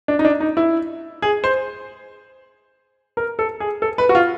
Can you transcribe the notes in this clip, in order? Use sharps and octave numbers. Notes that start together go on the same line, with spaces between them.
D4
D#4
D4
D#4
E4
G#4
C5
A#4
A4
G#4
A4
B4
F#4
F4